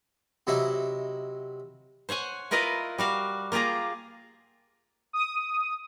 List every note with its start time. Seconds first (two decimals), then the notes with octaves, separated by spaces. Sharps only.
0.47 C3 F#3 D#4 E4
2.09 C5 C#5 F#5 G#5
2.51 E4 F4 A#4 B4 D#5 F5
2.98 G3 F#4 F5
3.52 A#3 F4 G4 G#4 A#5
5.13 D#6